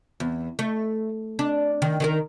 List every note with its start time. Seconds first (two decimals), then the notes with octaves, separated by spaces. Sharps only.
0.20 E2
0.59 A3
1.39 D4
1.82 D#3
2.00 D#3 G#4 A#4